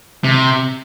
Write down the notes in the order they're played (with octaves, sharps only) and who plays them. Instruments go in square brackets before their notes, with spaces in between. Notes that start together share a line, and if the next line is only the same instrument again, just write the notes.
[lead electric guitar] C3